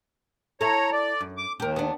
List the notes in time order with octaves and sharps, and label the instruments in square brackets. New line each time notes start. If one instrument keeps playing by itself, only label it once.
[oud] E4 A4 [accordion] C#5 A#5
[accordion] D5
[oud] F#2
[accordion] D6
[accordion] D#2 [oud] G4 A#4
[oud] B3 D4